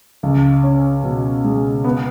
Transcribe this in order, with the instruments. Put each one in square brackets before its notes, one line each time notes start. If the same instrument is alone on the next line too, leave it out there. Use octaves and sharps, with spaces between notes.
[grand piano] C#2
C#4
B2
G#3
B3